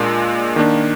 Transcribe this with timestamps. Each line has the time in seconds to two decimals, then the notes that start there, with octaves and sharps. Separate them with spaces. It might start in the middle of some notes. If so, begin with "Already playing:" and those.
Already playing: A#2 G#3 D4
0.56 D#3 A#3 D4